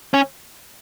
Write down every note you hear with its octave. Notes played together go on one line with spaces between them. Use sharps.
C#4